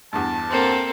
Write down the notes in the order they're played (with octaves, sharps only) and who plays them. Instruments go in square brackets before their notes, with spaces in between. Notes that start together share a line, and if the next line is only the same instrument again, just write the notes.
[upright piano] E2 G2 [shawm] A5
[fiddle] A#3 A4 [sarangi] C4